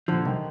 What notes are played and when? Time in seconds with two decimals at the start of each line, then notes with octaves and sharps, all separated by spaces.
0.08 A#2 D3 F3
0.25 C2 D#3